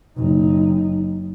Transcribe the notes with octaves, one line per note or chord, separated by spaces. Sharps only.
F#1 D#4